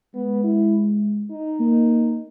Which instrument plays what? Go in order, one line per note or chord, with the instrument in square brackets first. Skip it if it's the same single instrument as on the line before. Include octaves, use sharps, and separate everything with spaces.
[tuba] G#3 [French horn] B3
[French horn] E4
D#4
[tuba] A#3